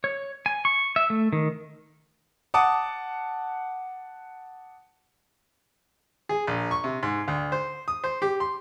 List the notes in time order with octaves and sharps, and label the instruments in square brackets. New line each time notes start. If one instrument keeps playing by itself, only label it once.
[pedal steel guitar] C#5
G#5
C#6
E5
A3
D#3
[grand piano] F#5 A5 D6 D#6
[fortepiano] G#4
A#1
C#6
C3
G#2
D2
C5
D#6
C5
G4
C6